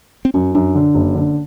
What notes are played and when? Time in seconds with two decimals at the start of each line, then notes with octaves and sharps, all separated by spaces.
0.25 C4
0.34 F#2 C#4
0.55 F#2 D4
0.75 D3
0.94 F#1
1.15 D3